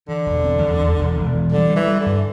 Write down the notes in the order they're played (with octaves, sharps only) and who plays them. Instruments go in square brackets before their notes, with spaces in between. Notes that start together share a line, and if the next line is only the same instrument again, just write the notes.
[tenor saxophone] D3 [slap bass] E3
[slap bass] E1
C4
E2
E2
E1
E1
E3
[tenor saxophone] D3 [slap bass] G3
[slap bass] G3
[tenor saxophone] E3
[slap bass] G3
[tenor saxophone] D3
[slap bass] G2